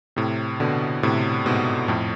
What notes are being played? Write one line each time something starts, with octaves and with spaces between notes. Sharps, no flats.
A2 C3
B2 D3
A2 C3
G#2 B2
F2 A2